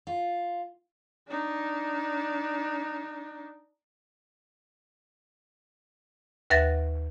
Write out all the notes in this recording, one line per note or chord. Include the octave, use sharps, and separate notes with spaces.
F4
D4 D#4
D#2 B4 E5 F#5 A6 A#6